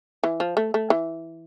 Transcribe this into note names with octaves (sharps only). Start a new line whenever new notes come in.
E3
F3
A3
A3
E3